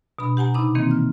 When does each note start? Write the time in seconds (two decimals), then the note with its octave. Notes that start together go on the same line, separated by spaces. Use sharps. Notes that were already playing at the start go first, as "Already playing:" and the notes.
0.19 B2 D4 B5
0.37 G4 F#5 G#5 A#5
0.54 C3 D#4 B5 D6
0.75 D#3 E3 A#3 C4
0.91 F6